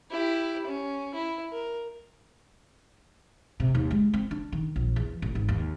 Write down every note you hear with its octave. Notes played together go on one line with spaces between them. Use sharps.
E4 G4
C#4
E4
A#4
C3
D#2
G#3
C4
D4
D#3
A#1
E2
A1
G#1
D#2